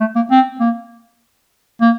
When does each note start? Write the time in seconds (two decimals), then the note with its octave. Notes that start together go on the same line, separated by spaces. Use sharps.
0.01 A3
0.16 A#3
0.31 C4
0.60 A#3
1.81 A#3